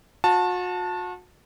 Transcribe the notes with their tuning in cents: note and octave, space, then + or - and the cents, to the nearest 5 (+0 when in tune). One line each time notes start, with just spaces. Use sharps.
F#4 -40 A5 +0